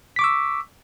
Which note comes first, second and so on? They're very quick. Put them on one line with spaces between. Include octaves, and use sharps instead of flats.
B6 D6 C#6 E6